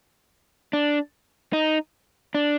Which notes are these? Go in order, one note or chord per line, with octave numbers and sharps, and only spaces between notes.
D4
D#4
D4